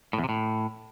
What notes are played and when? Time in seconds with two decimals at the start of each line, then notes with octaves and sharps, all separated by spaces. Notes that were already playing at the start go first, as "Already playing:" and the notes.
0.13 A2
0.18 E2
0.24 C3
0.29 A2